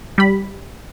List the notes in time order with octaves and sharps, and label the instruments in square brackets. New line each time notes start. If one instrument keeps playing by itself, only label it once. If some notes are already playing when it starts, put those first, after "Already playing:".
[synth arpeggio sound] G3 G4 B5